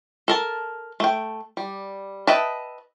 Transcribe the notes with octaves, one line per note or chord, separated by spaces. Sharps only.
A4 A#4 A5
A3 G5
G3
B4 D#5 E5 G5 A5